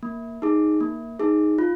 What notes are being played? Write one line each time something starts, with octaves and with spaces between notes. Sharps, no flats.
A#3
D#4 G#4
A#3
D#4 G#4
F4